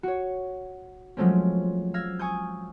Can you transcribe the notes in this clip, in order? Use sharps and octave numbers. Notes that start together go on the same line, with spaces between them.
F#4 C#5
F3 F#3 G#3 A3 C4 C#4
F5 E6 G#6 A#6
G#5 C#6 D#6 G6